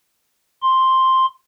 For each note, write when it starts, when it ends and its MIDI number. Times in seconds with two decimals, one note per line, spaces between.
0.62 1.26 84